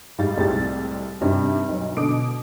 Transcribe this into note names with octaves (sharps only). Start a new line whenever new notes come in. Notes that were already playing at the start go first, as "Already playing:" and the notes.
G#2 G3 F5 A6
C2 A2 G#3 C4 G4 A6
G2 C3 C4 C#4 D#4
B1 F#3
B2 D3 D6 D#6 D7